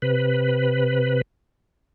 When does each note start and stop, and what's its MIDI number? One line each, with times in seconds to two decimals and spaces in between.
0.02 1.21 48
0.02 1.21 71